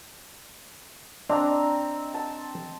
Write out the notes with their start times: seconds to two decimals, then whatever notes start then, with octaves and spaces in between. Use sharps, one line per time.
1.30 C4 D4 D#5 A#5
2.14 A5